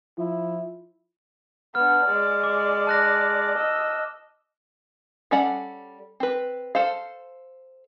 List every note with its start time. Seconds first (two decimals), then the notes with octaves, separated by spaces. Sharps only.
0.18 F3 E4
1.75 B3 D4 F6
2.05 G#3 D5
2.44 D6
2.87 A5 F#6 A#6
3.57 D#5 E6
5.31 G3 C#4 A4 D5 F#5
6.20 C4 B4
6.75 A4 C5 F5